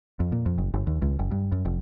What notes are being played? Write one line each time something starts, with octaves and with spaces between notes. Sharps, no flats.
F2
A#2
F2
F#1
G1
D#2
C#2
F#1
G2
F#2
F1